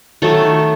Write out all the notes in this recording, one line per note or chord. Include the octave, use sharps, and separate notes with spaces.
D#3 F#3 A3 A4